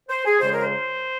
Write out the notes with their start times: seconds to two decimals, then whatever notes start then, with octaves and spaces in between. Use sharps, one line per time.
0.09 C5
0.25 G#4
0.40 F2 C#3 G#3 C#4 C5
0.52 A#4
0.61 C5